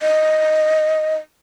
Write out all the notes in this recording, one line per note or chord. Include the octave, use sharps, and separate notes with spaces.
D#5